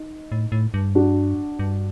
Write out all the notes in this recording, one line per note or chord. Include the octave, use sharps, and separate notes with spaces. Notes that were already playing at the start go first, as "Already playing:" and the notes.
Already playing: D#4
A2
A2
G2
D4 F#4
G2